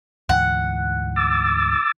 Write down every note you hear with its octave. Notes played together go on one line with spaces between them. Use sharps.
D2 G#2 E3 F#5
D6 E6 A6